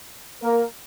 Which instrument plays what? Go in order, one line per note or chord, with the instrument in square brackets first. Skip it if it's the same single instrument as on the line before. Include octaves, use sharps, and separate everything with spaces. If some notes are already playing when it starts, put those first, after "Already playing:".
[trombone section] A#3 A#4